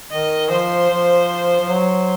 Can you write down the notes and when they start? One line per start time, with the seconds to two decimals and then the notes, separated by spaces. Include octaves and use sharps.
0.11 D#3 D#5
0.50 F3 C5
0.90 F3
1.60 F3
1.69 F#3